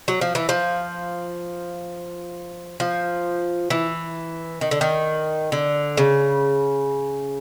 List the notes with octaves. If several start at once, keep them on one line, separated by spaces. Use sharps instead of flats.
F#3
F3
E3
F3
F3
E3
D#3
D3
D#3
D3
C#3